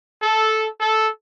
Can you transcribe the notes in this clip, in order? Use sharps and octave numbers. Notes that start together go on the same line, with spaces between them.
A4
A4